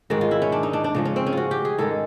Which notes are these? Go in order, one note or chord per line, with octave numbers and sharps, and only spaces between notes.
G#2 D#3 G#3 F#4
F4
E4
C#4
D4
D#4
D4
D4
C#3 F3 G#3 C#4
C#4
C4
C#4
F4 F#4
G4
G#4
G#2 D#3 G#3 A4